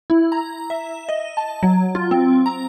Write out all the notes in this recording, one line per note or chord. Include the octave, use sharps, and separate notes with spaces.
E4
A#5
E5
D#5
A5
F#3
F4
C4
A#5